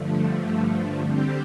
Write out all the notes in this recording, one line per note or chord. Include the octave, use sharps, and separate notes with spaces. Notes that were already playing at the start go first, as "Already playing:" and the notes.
Already playing: G2 D3 F3 A3
D3 G3 C4 G4